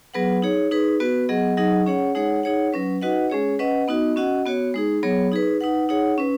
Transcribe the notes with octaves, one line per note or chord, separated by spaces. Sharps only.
F#3 B3 G#4 B4 F#5
D#4 G#4 C#5
D#4 G#4 B4
B3 F#4 B4
F#3 B3 G#4 D#5 F#5
F#3 D#4 G#4 D#5 F#5
C#4 G#4 C#5 F#5
G#3 D#4 G#4 C#5 F#5
D#4 G#4 C#5 F#5
F#3 C#4 B4
D#4 F#4 B4 D#5 F#5
G#3 C#4 G#4 C#5
C#4 B4 D#5 F#5
B3 D#4 F#4 D#5
C#4 F#4 D#5 F#5
B3 F#4 C#5
G#3 D#4 G#4
F#3 B3 G#4 C#5
D#4 G#4 B4
D#4 B4 F#5
D#4 G#4 C#5 F#5
C#4 B4